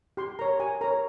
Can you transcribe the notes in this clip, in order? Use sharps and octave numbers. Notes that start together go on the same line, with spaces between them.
G4 C6
A#4 C#5 A#5
G4 G#5
A#4 C#5 A#5